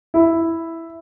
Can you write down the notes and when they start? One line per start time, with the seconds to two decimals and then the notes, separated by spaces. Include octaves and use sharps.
0.14 E4